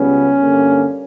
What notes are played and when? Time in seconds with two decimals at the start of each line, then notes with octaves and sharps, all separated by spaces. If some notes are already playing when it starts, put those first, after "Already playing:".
Already playing: C#2 C#3 G3 B3 C#4
0.40 G2 D3 A#3